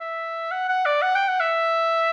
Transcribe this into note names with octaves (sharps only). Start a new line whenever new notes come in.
E5
F#5
F#5
D5
F#5
G5
F#5
E5